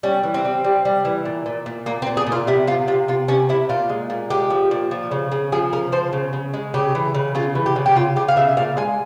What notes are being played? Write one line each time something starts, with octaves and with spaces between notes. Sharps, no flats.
G3 C#4
E3
C4
G3
G3
G3
E3
A#2
A#2
A#2
A#2 A#3
C4
A#2
G#4
A#2
F4
C3 E4
C3 F4
C3 F4
C3 F4
C3 C#4
C3 E4
A#2 F4
G#3
A#2
G#3 G4
F3
A#2
F3
C#3
C#3
F3 G#4
C#3 A#4
F3 C5
C#3
C#3
G#3
C#3 G4
E3
C#3
C#3 F4
E3
G4
C#3
G4
C#3 F4
C#3 G4
F5
C#3 E5
A#2 F5
G#3 G#5